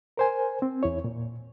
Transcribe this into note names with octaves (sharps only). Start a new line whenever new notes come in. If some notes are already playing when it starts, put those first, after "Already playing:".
A#4 C5 G#5
C4
E2 E4 C#5
A#2